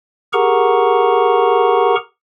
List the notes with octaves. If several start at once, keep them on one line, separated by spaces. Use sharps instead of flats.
G4 G#4 A#4 F#5 A#5 C#6